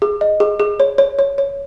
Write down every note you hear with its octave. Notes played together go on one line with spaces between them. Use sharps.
G#4
D#5
G#4
G#4
C#5
C#5
C#5
C#5